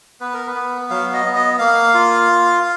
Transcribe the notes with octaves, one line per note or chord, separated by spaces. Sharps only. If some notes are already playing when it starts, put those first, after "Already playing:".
B3 B4
A#4
B4
B3
F#3 F5
D#5
B3
D#5
A#3 F5
F4